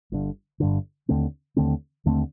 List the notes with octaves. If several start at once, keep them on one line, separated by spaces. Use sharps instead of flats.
G1 G2 D3
G1 G2 D3
D#2 D3 A3 C4
D#2 D3 A3 C4
D#2 D3 A3 C4